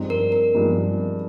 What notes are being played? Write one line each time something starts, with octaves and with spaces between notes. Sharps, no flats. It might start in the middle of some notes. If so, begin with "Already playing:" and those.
Already playing: G2 F3 G#3 C4 D#4
A#4
A#4
G2 F3 G#3 C4 D#4